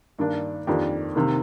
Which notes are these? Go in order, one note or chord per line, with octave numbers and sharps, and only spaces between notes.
G2 D#3 A#3 D4
F2 D#3 A#3 D4 G4
C3 D#3 A#3